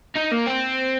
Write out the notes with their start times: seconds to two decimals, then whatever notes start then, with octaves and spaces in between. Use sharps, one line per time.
0.15 D#4
0.31 A#3
0.47 C4